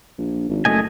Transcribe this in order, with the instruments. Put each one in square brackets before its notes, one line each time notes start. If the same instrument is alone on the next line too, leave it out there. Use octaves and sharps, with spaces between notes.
[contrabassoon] A#1
G#1
[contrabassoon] F#1 [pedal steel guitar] A3 D#5 G#5